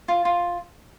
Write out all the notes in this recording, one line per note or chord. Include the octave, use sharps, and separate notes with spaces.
F4
F4